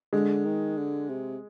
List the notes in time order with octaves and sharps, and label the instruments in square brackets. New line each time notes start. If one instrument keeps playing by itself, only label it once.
[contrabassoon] D3 [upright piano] G#3
[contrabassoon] D#3
D3
C3